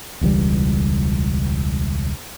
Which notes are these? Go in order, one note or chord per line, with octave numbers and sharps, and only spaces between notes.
E1 C#2 E3 G3